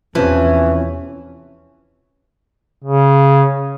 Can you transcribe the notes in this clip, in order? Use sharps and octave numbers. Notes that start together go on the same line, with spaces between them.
E2 C3 E3 F3 C#4
C#3